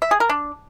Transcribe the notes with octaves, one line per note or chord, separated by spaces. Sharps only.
E5
G#4
A#4
D4